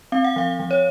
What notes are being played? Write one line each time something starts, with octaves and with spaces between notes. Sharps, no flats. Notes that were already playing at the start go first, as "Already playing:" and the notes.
C4 F5
F#5
F3 F5
F3
C#5